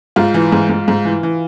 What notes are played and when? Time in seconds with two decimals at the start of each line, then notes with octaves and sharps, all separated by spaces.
0.16 G#2 F4
0.34 E3
0.52 G#2
0.69 G#2
0.88 G#2
1.05 E3
1.23 E3